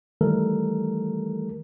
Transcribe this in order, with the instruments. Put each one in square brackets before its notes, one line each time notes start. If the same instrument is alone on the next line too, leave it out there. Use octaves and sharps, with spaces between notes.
[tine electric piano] D#3 E3 G3 A3 A4 A#4